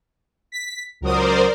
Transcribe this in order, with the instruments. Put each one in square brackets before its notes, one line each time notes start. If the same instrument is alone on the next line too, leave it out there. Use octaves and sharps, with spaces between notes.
[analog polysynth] B6
[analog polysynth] C#2 F#3 D#6 [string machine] A#4 C5 D5